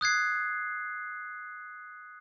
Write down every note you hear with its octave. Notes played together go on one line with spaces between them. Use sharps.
D#6 F#6 G#6 C7